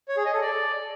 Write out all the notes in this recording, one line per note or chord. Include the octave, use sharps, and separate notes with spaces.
C#5
G#4
D#5
A4
D5